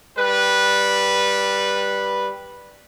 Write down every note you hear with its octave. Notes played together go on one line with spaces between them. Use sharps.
G3 B4